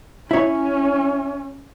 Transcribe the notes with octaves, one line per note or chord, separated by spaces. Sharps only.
C#4 E4 C#5